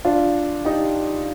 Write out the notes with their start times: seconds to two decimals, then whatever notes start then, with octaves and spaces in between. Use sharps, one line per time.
0.05 D4 F4
0.65 D#4 G4